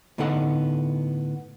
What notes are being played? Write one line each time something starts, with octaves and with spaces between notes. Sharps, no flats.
A2 D3 B3 D#4 A4 F#5